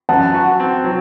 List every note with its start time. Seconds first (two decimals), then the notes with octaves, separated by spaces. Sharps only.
0.09 F#2 F#5 A5
0.34 F#4
0.60 C4
0.84 F#3